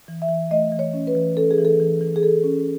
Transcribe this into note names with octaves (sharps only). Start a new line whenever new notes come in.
E3
E5
E3
A3 D#5
E3
C#5
C#4
B4
E3
C#4 A4
G#4
E3
A4
E3
E3
G#4
E3 A4
C#4